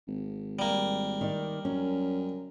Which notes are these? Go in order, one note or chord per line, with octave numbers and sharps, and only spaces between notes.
G#1
G3 A#3
D#3 D5
F#2 C#4